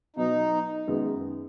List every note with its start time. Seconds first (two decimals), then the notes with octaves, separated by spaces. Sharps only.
0.16 B2 F#3 B3 D#4
0.87 F#2 D#3 G#3 B3 G#4